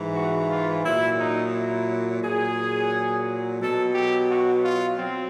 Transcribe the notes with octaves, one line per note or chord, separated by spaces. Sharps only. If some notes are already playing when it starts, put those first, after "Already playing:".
Already playing: G#2 E3
F#4
F4
A#2 F#3 E4
D#4
E4
A#2 F#3 G#4
B2 F#3 A4
G4
F#4
F4
F#3 C4